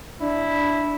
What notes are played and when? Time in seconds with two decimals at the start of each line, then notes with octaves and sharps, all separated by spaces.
0.22 D4 E4